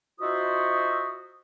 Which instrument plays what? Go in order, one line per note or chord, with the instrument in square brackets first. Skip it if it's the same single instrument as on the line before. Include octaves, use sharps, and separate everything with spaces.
[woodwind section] D#4 F4 F#4 C5 E5 D#6